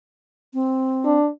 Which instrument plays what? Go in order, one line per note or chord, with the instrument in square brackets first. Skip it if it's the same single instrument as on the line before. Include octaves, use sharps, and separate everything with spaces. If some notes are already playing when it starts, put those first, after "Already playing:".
[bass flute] C4
[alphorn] D4